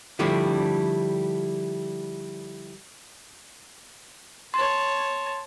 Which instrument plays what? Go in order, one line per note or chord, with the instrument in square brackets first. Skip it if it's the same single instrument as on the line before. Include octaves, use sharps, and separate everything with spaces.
[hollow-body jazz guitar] D3 F3 G3 A3 D4 E4
[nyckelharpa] C#5 A5 [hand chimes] C6